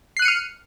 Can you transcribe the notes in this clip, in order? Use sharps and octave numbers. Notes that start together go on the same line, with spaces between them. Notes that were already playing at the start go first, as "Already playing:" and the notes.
F6 F#6 C7 C#7 D#7